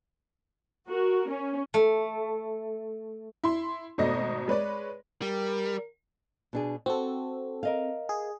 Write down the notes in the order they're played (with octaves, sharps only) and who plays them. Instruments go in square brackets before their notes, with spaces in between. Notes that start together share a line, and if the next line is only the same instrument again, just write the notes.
[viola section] F#4 A#4
C#4
[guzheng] A3
[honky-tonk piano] E4 C6
G#1 B2 A3 D5 D#5 A#6
G#3 B4 C#5 D5
[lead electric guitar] G3 [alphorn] A#4
[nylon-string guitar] B2 D4 G#4
[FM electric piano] C4 A4 [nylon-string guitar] F#4
[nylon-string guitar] A#4 D#5 F5
[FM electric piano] G#4